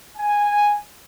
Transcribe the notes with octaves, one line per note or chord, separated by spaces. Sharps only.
G#5